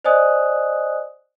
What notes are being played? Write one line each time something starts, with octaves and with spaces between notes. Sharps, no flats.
C5 D5 D#5 G#5 D#6 F#6